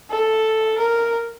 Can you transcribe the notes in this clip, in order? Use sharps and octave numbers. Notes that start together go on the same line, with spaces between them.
A4
A#4